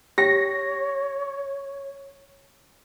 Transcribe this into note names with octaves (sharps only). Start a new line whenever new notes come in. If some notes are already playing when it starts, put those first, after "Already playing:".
G4 C#5 G5 A#6